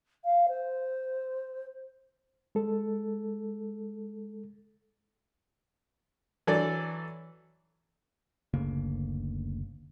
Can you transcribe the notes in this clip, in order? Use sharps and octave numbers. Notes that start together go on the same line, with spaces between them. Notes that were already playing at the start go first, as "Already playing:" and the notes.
F5
C5
G#3 A4
E3 F#3 D4 A4 D5
F#1 D2 C#3 A#3